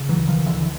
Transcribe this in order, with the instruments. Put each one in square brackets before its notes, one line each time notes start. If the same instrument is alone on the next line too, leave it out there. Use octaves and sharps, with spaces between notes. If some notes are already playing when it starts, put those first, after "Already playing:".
Already playing: [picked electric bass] C#3
E3 F#3
D2
D#3 F3
D2
D3 E3
E3